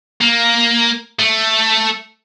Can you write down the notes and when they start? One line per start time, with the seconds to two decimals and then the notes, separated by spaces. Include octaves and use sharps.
0.21 A#3
1.19 A3